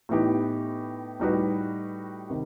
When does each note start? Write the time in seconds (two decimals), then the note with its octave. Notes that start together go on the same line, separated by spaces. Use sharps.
0.09 A2 E3 B3 D#4 G4
1.20 A2 G3 D#4 F#4 B4
2.30 C3 D#3